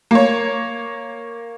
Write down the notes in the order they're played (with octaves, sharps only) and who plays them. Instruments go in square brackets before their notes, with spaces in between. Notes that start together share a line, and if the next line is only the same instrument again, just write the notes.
[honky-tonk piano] A#3 C#5